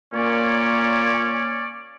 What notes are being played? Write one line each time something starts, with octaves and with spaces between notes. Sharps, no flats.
A#2 A#3 C#4 C#5 D5